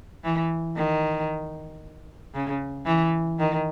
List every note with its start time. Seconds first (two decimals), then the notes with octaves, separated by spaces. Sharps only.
0.24 E3
0.76 D#3
2.34 C#3
2.86 E3
3.39 D#3